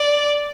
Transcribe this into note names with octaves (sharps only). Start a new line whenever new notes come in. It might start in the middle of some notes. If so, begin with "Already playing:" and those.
Already playing: D5